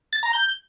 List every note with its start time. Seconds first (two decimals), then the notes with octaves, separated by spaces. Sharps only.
0.13 A6
0.23 A#5
0.33 G6